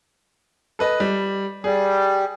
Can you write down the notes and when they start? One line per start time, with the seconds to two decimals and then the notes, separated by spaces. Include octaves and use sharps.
0.79 A4 B4 D#5
1.00 G3
1.64 G3 G#4